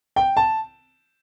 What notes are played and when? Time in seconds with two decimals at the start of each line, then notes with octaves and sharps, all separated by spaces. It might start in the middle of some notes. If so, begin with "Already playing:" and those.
0.16 G5
0.37 A5